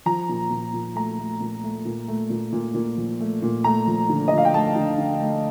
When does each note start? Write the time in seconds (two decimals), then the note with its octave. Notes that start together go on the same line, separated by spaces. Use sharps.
0.06 F3 A#5
0.29 A#2
0.51 A#2
0.74 A#2
0.95 A3 A#5
1.19 A3
1.41 A#2
1.64 A3
1.85 A#2
2.08 A3
2.30 A#2
2.53 A#2
2.74 A#2
2.97 F3
3.20 A3
3.42 A#2
3.64 A3 A#5
3.87 F3
4.09 D3
4.28 D#5
4.32 F3
4.38 F5
4.45 G5
4.54 A3 A5
4.76 D3
4.98 D3
5.21 A3